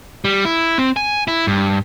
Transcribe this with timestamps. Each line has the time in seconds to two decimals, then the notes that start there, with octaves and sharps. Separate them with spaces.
0.25 G3
0.45 E4
0.78 C4
0.96 G#5
1.28 E4
1.47 G2